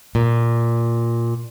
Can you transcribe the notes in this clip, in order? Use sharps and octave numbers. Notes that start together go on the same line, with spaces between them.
A#2